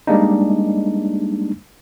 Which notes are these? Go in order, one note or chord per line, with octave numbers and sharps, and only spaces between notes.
G3 G#3 A#3 D4 D#4